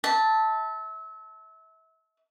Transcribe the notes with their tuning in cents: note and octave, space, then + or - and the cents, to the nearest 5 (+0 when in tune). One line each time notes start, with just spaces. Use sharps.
E5 -30 A5 +0